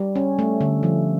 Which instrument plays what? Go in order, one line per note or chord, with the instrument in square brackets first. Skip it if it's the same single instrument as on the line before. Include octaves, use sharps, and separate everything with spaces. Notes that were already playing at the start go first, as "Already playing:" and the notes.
Already playing: [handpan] G3
C#4
A3
D3
F3